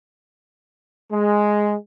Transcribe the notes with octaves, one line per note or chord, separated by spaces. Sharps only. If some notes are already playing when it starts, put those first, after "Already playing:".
G#3